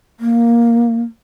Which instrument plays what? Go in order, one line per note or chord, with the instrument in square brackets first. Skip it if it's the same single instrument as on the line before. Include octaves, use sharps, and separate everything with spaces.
[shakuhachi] A#3